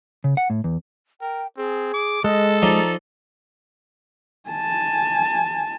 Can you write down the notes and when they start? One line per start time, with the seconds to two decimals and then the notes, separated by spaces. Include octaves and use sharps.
0.24 C#3
0.37 F#5
0.50 A2
0.64 E2
1.21 A#4 G5
1.57 C4 G#4
1.94 D6
2.24 G#3 A4 D#5
2.62 F3 D#4 D5 A#5
4.50 G#5 A5